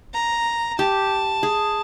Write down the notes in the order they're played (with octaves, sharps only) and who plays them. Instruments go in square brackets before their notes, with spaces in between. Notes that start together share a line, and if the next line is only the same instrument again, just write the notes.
[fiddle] A#5
[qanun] G4 [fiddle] A5
[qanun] G#4